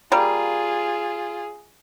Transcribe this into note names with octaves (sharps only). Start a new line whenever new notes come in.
G3 A#3 F4 G#4